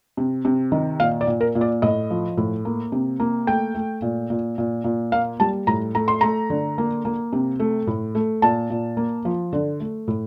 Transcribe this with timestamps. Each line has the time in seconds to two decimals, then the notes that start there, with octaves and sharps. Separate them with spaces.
0.17 C3
0.45 C3
0.72 D#3
1.00 A#2 F5
1.21 D5
1.27 A#2
1.41 A#4
1.55 A#2
1.61 D5
1.82 A2 D#5
2.10 F3
2.37 A2
2.65 A#3
2.92 C3
3.20 A#3
3.47 A3 G5
3.75 A3
4.02 A#2
4.30 A#2
4.58 A#2
4.84 A#2
5.12 A#3 F5
5.40 G3 A5
5.67 A2 A#5
5.95 A3 A#5
6.08 C6
6.21 A3 A#5
6.50 D3
6.78 A#3
7.05 A#3
7.33 C3
7.60 A3
7.87 A2
8.15 A3
8.42 A#2 A5
8.70 A#2
8.97 A#3
9.25 F3
9.53 D3
9.80 A3
10.08 A2